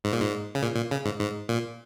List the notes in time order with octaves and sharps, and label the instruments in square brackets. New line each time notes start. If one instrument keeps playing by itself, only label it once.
[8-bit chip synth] G#2
A#2
G#2
C#3
A#2
A#2
C#3
G#2
G#2
A#2